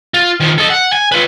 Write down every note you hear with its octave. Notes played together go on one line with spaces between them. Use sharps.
F4
D#3 F3
A4 D#5
F#5
G#5
F4 B4